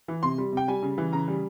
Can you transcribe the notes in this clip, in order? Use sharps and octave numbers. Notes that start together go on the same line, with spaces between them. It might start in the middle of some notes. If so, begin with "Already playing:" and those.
E3
C3 C6
G3
C3 G5
G3 G#5
C#3
E3
C#3 A#5
G3